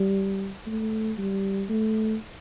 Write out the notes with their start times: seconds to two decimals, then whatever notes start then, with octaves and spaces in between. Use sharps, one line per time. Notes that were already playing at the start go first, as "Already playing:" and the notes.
Already playing: G3
0.67 A3
1.18 G3
1.69 A3